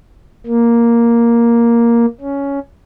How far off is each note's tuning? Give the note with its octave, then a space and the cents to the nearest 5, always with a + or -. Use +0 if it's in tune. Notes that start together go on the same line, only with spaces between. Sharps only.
A#3 +5
C#4 +10